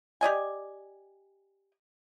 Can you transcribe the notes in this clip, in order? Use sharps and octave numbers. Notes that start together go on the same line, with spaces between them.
G4 D5 D#5 G#5